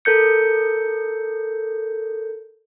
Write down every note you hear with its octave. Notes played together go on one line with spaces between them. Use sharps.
A4 A#4 G6 C#7